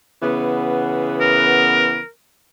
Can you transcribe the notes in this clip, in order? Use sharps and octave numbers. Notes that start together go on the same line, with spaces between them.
C#3 E3 B3
A#4